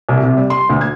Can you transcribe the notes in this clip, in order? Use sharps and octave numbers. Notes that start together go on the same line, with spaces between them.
C2
C3
G3
C6
D2
G#6